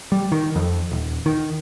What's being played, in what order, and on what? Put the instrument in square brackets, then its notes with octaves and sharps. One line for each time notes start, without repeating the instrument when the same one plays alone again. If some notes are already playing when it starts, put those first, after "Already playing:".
[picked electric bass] G3
D#3
F2
D#1
D#3